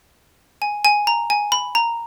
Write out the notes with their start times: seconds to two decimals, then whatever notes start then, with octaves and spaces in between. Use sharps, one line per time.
0.62 G#5
0.85 G#5
1.07 A#5
1.30 G#5
1.52 B5
1.75 A#5